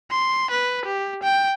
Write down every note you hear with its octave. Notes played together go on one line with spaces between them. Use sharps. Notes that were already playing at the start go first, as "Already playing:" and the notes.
C6
B4
G4
G5